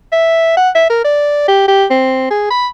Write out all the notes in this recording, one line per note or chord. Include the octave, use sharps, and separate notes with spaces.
E5
F#5
E5
A#4
D5
G4
G4
C4
G#4
B5